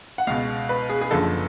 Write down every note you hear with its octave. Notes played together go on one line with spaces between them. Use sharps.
F#5
C#2 B2 F5
B4
G#4
G#4
F#1 F#2 D3 F3 A4